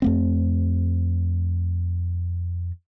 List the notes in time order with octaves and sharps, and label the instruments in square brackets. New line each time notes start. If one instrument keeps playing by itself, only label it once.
[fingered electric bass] F2 A3 C4